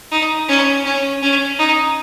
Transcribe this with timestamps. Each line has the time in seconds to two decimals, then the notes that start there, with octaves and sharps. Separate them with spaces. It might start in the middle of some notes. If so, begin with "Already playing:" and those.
0.11 D#4
0.48 C#4
0.85 C#4
1.22 C#4
1.59 D#4